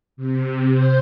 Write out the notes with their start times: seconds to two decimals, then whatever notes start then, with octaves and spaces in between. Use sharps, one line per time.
0.17 C3
0.70 C5